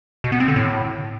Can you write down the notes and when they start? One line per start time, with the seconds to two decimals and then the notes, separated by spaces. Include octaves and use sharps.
0.24 B2
0.32 B3
0.40 C4
0.48 D3
0.56 A2